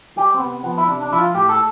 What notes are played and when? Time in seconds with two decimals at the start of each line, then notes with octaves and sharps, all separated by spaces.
0.16 G3 G4
0.34 C4
0.40 C3 B3
0.63 F3 B3
0.78 E4
0.87 C3 D4
1.03 D4
1.10 F3 E4
1.19 F4
1.34 A2 G4
1.49 A4